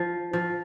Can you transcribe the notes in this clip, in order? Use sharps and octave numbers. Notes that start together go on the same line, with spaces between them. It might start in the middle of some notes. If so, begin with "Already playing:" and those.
Already playing: F3
F3